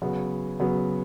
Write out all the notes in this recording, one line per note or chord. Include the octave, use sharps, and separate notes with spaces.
C#3 F#3 B3 F#4
C#3 F#3 B3 F#4